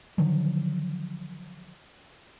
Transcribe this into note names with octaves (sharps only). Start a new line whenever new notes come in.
D3 D#3 F3 F#3